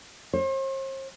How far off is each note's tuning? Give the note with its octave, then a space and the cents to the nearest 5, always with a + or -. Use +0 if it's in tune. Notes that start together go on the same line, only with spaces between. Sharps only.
C5 +40